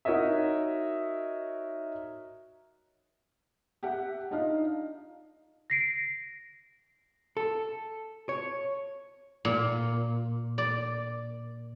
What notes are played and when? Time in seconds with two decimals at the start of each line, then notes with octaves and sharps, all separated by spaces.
0.05 D#4 F#4 A#4 C#5 D#5 E5
3.83 G4 E5 F#5
4.31 D4 D#4 F4 D#5 F5
5.70 A#6 C7 D7
7.37 A4
8.29 C#5
9.45 A#2
10.58 D5